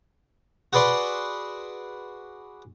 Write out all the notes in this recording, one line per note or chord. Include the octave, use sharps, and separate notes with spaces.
F#4 G#4 B4 D5 C6